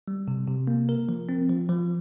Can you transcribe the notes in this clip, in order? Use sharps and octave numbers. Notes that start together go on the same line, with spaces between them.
G3
C3
C3
A#3
A#4
F3
C4
F3
F3